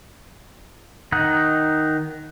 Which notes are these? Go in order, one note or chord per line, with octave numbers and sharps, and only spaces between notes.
D#3 D#4 F#5